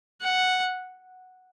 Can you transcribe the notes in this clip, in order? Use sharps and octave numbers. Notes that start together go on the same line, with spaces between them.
F#5